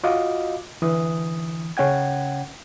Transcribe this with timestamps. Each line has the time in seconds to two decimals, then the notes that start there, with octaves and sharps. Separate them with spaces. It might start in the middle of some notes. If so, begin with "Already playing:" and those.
0.04 F4 F#4 D#5 F5 D6
0.82 D3 E3 D#6
1.77 C#3 C#4 F#5 G5 G#6